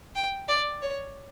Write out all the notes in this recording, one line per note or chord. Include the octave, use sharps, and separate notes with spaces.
G5
D5
C#5